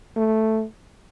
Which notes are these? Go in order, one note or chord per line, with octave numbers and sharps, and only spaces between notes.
A3